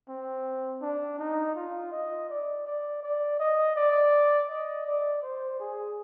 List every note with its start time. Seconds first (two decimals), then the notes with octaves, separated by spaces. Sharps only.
0.09 C4
0.82 D4
1.19 D#4
1.55 F4
1.92 D#5
2.29 D5
2.66 D5
3.03 D5
3.40 D#5
3.76 D5
4.49 D#5
4.87 D5
5.22 C5
5.60 G#4